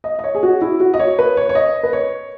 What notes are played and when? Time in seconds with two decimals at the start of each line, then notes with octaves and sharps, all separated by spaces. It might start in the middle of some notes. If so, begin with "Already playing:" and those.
0.04 D#5
0.19 D#5
0.24 C#5
0.35 G#4
0.43 F#4
0.62 E4
0.80 F#4
0.94 D#5
1.00 C#5
1.19 B4
1.37 C#5
1.49 C#5
1.55 D#5
1.83 B4
1.93 C#5